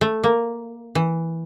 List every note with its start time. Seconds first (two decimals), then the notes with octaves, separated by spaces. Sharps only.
0.01 A3
0.24 A#3
0.95 E3